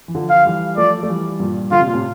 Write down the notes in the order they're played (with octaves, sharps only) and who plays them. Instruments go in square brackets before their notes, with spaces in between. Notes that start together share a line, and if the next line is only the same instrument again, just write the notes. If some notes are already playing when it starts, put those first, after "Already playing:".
[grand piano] E3
D3 F3
[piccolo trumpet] F5
[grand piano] E3 G3
[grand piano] F3 A3 [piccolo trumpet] D5
[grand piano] A3
E3 G3
G2 A#2
[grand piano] D3 [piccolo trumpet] F4
[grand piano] C3
A#2
A2 C3